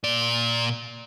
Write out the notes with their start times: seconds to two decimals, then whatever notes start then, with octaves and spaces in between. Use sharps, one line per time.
0.04 A#2 D5